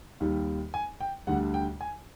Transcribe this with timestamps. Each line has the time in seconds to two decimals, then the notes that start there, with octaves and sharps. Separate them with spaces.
0.20 D#2 D#3 G3
0.74 G#5
1.00 G5
1.27 D2 D3 G3 F#5
1.54 G5
1.81 G#5